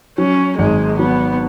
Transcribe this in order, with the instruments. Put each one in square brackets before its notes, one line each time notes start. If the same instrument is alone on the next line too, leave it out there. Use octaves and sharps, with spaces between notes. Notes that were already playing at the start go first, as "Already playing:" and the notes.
[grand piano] F#3 [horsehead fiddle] C#4
[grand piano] G#1 [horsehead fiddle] G#3
[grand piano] F#3 [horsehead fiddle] B3